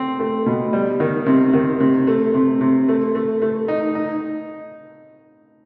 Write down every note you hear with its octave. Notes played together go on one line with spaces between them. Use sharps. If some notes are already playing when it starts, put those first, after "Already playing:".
Already playing: A3 C4
A3
B2
G3
D#3
C3
D#3
C3
A3
C3
C3
A3
A3
A3
D#4
D#4